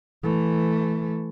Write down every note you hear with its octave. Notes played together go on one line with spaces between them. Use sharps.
E3 A3